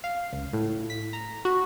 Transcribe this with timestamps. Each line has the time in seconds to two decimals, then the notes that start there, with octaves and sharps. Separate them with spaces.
0.04 F5
0.32 C#2
0.53 A2
0.90 B6
1.13 A#5
1.45 F#4